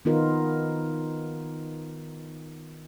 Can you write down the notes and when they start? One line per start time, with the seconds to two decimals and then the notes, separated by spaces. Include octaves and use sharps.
0.05 D#3 B3 D#4 F4 A#4